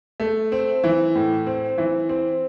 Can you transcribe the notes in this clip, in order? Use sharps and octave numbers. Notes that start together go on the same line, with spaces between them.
A3
C4
E3
A2
C4
E3
C4